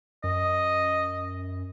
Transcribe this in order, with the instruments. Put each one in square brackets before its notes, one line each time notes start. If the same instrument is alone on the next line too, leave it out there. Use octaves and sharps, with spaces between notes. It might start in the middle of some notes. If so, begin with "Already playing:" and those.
[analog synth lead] F#2 [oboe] D#5